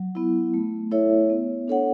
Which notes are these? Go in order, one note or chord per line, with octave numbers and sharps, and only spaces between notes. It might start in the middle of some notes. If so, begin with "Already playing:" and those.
Already playing: F#3
B3 E4
A3
E4 A4 C#5 E5
B3
D4 A4 C#5 F#5